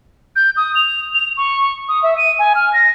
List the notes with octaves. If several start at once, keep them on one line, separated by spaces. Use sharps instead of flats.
G6
D#6
F7
F7
C#6
D#6
E5
D#7
G#5
F6
A#6